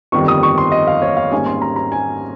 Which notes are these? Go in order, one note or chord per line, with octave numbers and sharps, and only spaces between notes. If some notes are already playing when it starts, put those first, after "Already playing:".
G1 F2 D#3 G3 C#6
D#6
C#6
C6
D#5
F5
C#5
F5
G#1 G#2 G3 A#3 C#4 G#5
C6
A#5
A#5
G#5